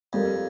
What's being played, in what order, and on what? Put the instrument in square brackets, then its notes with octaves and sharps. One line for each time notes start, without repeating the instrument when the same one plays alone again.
[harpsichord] F2 [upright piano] G3 C4 G4 A#4